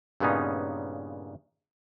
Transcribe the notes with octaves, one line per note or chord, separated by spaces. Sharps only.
G2 A#2 C#3 B3 C#4 D#4